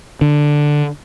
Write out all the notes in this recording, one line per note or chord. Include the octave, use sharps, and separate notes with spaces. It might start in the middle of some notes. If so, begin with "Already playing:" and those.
D3